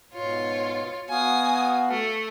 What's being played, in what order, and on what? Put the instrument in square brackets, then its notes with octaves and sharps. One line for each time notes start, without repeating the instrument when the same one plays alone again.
[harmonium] G#2 B2 [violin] F4 C#5
[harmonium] B3 F#4 F5 [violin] G#5 D#6
[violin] A3